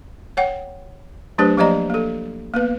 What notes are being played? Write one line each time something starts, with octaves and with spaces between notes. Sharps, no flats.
C#5 F#5 G5
F#3 A3 D4 G4 B4 C5
F3 A#3 G4 D5 D#5 A#5
A#3 A4
A#3 B3 B4